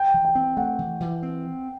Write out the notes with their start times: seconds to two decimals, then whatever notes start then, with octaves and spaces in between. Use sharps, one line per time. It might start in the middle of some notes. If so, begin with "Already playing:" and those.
Already playing: G5
0.14 E3
0.25 G5
0.35 C4
0.57 A3 F#5
0.79 E3
1.00 E3
1.23 C4